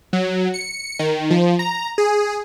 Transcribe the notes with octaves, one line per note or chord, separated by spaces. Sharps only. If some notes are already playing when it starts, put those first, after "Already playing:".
F#3
C#7
D#3
F3
A#5
G#4